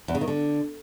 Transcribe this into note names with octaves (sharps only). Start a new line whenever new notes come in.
E2
C#3
D#3
D3